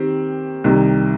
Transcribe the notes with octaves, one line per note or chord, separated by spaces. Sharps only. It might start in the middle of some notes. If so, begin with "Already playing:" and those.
Already playing: D#3 C4 G4
C2 C3 D#3